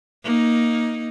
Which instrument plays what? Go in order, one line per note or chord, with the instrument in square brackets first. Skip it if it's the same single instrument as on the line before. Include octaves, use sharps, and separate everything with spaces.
[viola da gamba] A#3 D#4